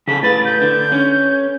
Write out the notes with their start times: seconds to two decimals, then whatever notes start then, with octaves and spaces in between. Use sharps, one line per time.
0.08 C#3 G#4 A4 B6
0.23 A2 B4 A6
0.45 G6
0.62 D3
0.92 C#4